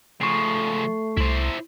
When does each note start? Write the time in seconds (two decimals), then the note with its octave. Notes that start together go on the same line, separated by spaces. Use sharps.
0.21 C#3 F3 A3 C#6 C7
1.17 C2 E4 C5